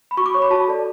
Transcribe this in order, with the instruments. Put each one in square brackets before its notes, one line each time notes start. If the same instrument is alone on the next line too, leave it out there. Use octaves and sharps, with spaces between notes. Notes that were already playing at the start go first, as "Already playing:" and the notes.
[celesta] B5
F#4 C#6
D6
C#5 C#6
B5
F#4 A5
A4 D5